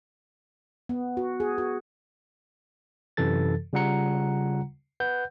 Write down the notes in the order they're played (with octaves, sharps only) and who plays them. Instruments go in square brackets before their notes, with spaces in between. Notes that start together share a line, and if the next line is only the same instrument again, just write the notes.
[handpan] B3
F#4
G#4
F#4
[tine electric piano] F#2 C3 E3 A4 A6
C#3 G3 F4 F#5 A#5 C#7
B4 F#5 G6